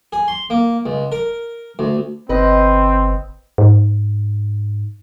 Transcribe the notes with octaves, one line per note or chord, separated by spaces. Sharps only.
G#4
C6
A#3
C#2
A#4
D2
G1 C4 B4 D#5
G#2